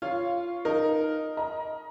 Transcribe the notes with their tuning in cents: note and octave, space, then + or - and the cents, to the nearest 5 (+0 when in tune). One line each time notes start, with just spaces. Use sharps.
F4 -10 C#5 +0 F5 +0
D#4 +0 A#4 +0
D#5 +10 A#5 +30